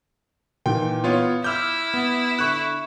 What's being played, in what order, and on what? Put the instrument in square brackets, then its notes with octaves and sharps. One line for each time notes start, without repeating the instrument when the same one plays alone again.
[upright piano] A#2 D#3 E3 [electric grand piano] G5
[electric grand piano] B3 F4 C#5
[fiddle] E4 [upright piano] D6 [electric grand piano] E6 F6 G6
[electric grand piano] B3
[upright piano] D3 [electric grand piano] C#6 F#6